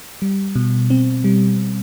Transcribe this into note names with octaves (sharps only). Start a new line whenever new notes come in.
G3
B2
C4
G3